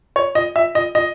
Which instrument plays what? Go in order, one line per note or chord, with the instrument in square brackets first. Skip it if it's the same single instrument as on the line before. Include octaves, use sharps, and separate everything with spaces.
[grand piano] C#5
D#5
E5
D#5
D#5